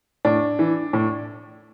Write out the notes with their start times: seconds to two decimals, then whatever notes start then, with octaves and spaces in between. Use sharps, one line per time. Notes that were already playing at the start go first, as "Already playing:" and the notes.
0.25 A2 D4
0.59 E3
0.93 A2